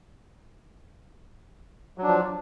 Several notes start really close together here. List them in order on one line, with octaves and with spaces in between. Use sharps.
F#3 D4 F3